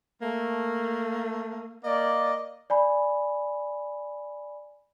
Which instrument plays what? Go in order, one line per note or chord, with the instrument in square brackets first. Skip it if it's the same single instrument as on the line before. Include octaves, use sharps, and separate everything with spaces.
[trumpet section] A3 [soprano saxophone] A#3
[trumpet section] A#3 D5 [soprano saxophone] D#5
[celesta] D5 G#5 B5